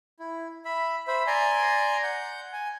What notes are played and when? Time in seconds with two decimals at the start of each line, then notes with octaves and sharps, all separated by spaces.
0.20 E4
0.65 E5 B5
1.08 C5 E5 B5
1.27 D5 G#5 A#5 C6
2.03 F#5 G6
2.53 G#5